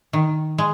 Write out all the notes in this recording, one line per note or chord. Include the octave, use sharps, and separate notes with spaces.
D#3
G#3